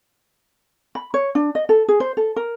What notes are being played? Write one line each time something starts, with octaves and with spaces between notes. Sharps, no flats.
B5
C#5
D4
D#5
A4
G#4
C5
A4
A#4